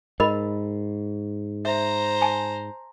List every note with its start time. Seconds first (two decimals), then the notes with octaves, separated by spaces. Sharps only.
0.20 G#2 A#4 D#5 B5
1.65 C5 E5 A#5
2.22 G#5 A5